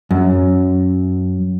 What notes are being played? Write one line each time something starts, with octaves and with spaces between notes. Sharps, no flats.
F#2